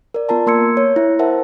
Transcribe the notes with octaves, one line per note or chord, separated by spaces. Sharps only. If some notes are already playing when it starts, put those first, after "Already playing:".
A#4 D5
B3 F4 A#4 A5 A#5
A#3 A#4 C6 E6 G#6 C#7
C#5
E4 E5
A#4 C5 E5 F#5 A5